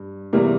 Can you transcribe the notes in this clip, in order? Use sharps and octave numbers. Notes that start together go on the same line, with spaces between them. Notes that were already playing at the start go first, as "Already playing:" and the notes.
Already playing: G2
E2 C3 E3 G3 A#3